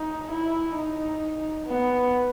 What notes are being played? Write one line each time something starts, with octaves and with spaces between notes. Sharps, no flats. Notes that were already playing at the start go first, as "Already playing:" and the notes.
Already playing: D#4
E4
D#4
B3